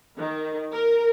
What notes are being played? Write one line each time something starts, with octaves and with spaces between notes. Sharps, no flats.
D#3
A#4